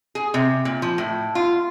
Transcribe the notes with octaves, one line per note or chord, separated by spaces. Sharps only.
G#4
C3
A#2
F3
A2
F4